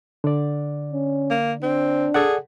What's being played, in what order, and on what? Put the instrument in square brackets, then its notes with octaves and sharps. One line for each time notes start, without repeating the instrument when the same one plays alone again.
[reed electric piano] D3 D5
[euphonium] C#4
[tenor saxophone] A#3
[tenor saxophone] C4 [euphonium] D4
[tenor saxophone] G#4 [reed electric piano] A4 D5 F#5